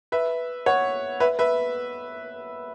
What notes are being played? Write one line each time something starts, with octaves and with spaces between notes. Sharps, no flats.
B4 E5
C#5 F#5
B4 E5
B4 E5